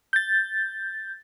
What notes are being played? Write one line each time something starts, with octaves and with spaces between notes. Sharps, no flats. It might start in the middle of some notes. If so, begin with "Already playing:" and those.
G6 A6